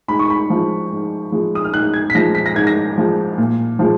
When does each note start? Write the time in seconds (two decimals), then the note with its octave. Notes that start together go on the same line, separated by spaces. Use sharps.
0.08 G#2 B5
0.19 C#6
0.30 B5
0.50 F3 G#3
0.91 G#2
1.32 F3 G#3
1.55 D#6
1.64 F6
1.73 G#2 F#6
1.94 G#6
2.10 B6
2.15 F3 G#3 A#6
2.35 B6
2.46 A#6
2.56 G#2 G#6
2.67 A#6
2.98 F3 G#3
3.38 A#2
3.79 F3 G#3